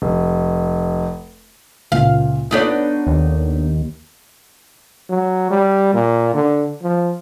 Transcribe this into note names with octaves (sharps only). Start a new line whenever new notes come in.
F1
C#2 A#2 F4 F5
B3 D4 D#4 F4 A4 C#5
D#2
F#3
G3
A#2
D3
F3